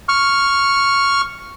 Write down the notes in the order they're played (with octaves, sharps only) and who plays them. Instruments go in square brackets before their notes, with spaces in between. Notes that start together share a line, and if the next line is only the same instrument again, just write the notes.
[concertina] C#6 F6